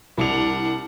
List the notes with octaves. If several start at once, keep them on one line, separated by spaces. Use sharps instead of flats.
C2 D4 F#5 F7